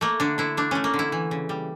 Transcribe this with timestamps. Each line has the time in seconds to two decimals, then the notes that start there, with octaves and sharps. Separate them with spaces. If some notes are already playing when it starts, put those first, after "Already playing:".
0.01 A3 A#3
0.20 D3 D4
0.38 D3 E4
0.57 A3 D4
0.71 A3 C#4
0.84 A#3
0.94 D3
0.99 E4
1.12 E3
1.31 C#3
1.49 G3